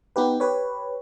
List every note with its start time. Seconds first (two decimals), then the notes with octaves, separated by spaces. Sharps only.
0.16 B3 D#4 G4 B4
0.40 G4 B4 C#5